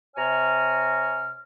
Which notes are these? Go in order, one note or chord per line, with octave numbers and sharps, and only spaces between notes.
C3 C#5 G#5 A#5 F6